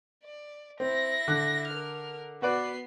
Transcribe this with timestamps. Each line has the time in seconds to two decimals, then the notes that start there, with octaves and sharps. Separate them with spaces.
0.24 D5
0.80 C4 E4 A#6
1.28 D3 F#6
1.68 A#4 F6
2.42 B3 F#4 B4 D5 C7